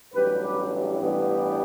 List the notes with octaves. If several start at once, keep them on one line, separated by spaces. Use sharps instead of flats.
A1 G2 F#3 G4 B4
G4 B4
E4 G4
A1 G2 E3 B3